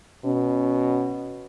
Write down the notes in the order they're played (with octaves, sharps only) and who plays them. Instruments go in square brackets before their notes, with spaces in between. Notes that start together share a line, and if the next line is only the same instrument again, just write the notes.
[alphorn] B2 [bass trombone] C#4